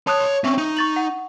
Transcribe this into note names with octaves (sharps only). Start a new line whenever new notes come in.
C#5 A5 C6 D#6 F#6
C4 C#4 E5 C#6
D#4
C#6 A6 F#7
F#5